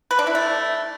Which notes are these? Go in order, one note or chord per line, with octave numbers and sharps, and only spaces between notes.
B4
D4
E4
A3